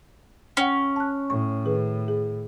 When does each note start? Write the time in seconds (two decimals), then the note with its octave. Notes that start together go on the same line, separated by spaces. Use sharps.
0.57 C#4 F#5 G5
0.96 A5 F#6
1.30 A2 C#6
1.65 D#3 G#4 B4
2.08 G#4